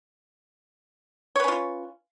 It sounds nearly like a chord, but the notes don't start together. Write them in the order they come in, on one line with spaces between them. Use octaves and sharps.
C#5 B4 C#4 F4